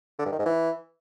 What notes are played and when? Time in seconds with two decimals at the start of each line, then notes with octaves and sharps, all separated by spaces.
0.19 D3
0.26 G2
0.32 D#3
0.39 G#2
0.46 E3